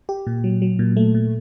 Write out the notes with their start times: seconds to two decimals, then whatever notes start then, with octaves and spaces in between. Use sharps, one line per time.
0.09 G4
0.27 A#2
0.44 F#3
0.62 F#3
0.79 A#2
0.97 A3
1.15 A#2